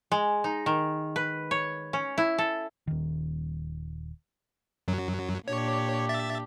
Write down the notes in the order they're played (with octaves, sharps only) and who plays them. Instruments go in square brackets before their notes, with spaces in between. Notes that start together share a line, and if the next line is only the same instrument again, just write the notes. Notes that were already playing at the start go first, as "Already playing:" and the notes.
[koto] G#3
D#4
D#3
B4
C#5
C#4
E4
A4
[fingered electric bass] D#1 D#3
[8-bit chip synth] F#2 F#3
[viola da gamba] A#2 D4 G4 [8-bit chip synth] C#5
[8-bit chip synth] E5 A6